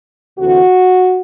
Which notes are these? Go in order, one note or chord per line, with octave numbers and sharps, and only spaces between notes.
D2 C3 E3 A3 C4 F#4